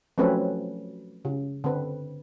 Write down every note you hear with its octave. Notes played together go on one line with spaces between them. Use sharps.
F3 F#3 A3 C4 C#4 B4
C#3
D3 C4 B4